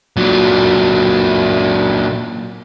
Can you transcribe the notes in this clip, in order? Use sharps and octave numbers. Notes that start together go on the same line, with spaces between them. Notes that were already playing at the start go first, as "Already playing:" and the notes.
A#2 F#3